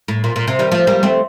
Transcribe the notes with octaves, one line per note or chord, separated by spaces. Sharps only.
A2
A#2
A#2
C3
D#3 G3
F3 A3
G3 A#3
A3 C4